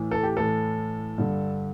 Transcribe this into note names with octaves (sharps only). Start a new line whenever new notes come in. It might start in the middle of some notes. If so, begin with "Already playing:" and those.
Already playing: A2 E3
A4
G4
A2 E3 A4
G2 D3